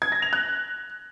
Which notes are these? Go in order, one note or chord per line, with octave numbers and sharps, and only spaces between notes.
G#6
A#6
F7
F#6